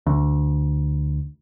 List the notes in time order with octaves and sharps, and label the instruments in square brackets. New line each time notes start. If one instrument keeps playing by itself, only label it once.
[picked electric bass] D2